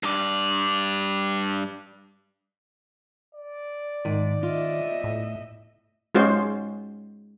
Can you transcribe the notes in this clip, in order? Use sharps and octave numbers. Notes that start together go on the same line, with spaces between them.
G2 D5
D5
G#2 D#3
F4 D#5 E5
A2
G#3 C#4 F4 F#4 C5